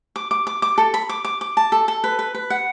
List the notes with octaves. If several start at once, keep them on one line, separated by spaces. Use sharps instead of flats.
D6
D6
D6
D6
A4
B5
D6
D6
D6
A5
A4
A4
B4
B4
B4
F#5